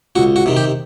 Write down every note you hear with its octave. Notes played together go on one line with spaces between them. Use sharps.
C#2 F#4
F#4
C3 D#3
G4